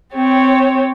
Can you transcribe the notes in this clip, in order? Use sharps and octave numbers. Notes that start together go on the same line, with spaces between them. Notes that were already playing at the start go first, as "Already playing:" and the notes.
C4 G4 C#5